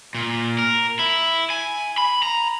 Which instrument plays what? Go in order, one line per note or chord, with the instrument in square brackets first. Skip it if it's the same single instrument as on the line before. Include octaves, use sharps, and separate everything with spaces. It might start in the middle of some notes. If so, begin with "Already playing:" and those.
[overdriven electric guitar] A#2
A#4
E4
G#5
B5
A#5